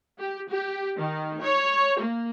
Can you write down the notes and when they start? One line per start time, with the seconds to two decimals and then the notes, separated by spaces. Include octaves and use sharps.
0.19 G4
0.51 G4
0.97 D#3
1.41 C#5
1.99 A#3